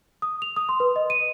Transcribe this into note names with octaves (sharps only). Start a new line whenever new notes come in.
D#6
F7
D#6
C6
B4
D#5
D#7